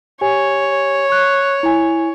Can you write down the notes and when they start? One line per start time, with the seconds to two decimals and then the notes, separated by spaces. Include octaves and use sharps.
0.21 G4 C#5 G#5
1.10 C#6 F#6
1.63 E4 G#5